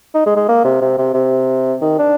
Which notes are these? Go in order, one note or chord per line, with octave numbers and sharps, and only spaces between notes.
D#4
G#3
G#3
A#3
C3
C3
C3
C3
D#3
D4